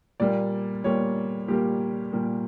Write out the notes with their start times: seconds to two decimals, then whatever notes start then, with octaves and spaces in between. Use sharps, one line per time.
0.20 A#2 G3 A#3 D5
0.84 A#2 G3 A#3 C#5
1.48 A#2 G3 A#3 G4
2.12 A#2 G3 A#3